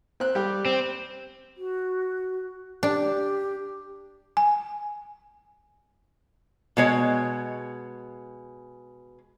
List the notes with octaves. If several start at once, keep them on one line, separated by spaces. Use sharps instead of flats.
C4 F#6
G3 G4
C4
F#4
D4 G4
G#5
B2 G#3 C#5